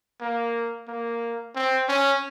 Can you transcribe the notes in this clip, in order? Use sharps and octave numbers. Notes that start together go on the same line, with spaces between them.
A#3
A#3
C4
C#4